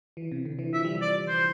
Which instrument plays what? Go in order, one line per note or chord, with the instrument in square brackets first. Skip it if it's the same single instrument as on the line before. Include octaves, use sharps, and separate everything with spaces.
[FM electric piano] E3
C3
D3
E3
[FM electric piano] F3 [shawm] E5
[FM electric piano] G3
F3
[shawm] D5
C5